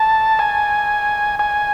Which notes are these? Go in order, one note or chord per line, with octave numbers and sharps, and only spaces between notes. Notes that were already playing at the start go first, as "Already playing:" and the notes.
Already playing: A5
G#5
G#5